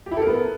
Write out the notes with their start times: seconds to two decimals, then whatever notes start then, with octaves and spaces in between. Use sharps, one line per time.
0.06 G4
0.11 E4
0.17 A4
0.22 A#4
0.27 B3